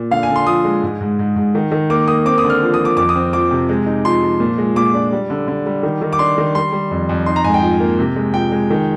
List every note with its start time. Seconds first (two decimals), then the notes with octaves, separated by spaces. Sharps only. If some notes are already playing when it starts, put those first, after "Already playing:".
Already playing: A#2
0.11 D3 F5
0.23 G#5
0.29 D3
0.36 C6
0.47 F3 D#6
0.64 G#3
0.83 G#2
1.01 G#2
1.19 G#2
1.36 G#2
1.55 D#3
1.72 D#3
1.90 A#3 D6
2.08 A#3 D#6
2.25 C4 D6
2.38 D#6
2.44 D3
2.50 F6
2.62 F3
2.74 D#6
2.80 F3
2.85 D6
2.97 F2 D6
3.09 D#6
3.15 C4
3.33 F3 D6
3.51 C3
3.69 G#3
3.86 D#4
4.05 F3 C6
4.23 F3
4.40 A#2
4.58 G#3
4.76 A#2 D6
4.94 D4
5.12 G3
5.30 D3
5.48 D3
5.66 G3
5.83 D#3
6.02 D#3
6.13 D6
6.19 D4 C6
6.38 D#3
6.55 G3 C6
6.72 G3
6.91 F2
7.09 F2
7.26 D#4 C6
7.36 A#5
7.44 G#2 G#5
7.54 G5
7.62 F3
7.80 A#3
7.99 C3
8.16 G#3
8.34 F3 G5
8.52 G#3
8.70 D#3